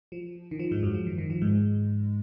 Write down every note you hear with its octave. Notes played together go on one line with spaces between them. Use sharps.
F3
D#3
F3
G#2 G#3
F#2 F#3
F3
D#3
D#3
F3
G#2 G#3